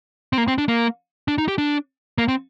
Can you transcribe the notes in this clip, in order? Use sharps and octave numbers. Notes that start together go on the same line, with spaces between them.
C4
A#3
C4
D4
A#3
D4
D#4
G4
D4
A#3
C4